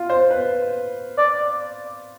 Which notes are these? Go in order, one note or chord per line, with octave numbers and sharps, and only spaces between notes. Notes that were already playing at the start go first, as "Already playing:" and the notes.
Already playing: F4
C5
B4
D5